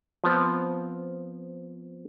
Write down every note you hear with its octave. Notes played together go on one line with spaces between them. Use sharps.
F3 B3 C4